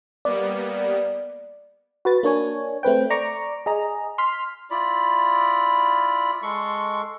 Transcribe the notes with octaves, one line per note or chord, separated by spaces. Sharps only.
G3 A#3 B3 D5
F#4 B4 A6
A#3 D4 C#5 G#5
A3 C4 B4 G5
D5 A#5 C#6 D6
G#4 D#5 A#5
C6 F6 B6
E4 F4 D5 B5
G#3 A4 C6 C#6